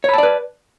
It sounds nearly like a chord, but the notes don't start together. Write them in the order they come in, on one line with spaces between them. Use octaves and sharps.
C#5 B5 A5 D5 B4